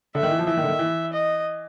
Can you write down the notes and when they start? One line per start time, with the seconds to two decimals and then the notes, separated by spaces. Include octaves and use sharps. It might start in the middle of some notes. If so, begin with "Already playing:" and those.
0.15 D3 E5
0.23 D#3
0.31 E3
0.39 F3
0.47 E3 E5
0.57 D#3
0.64 D3
0.68 D#3
0.79 E3
1.13 D#5